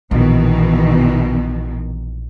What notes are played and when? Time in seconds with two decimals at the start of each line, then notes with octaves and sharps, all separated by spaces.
0.11 A#1 B2 D#3 E3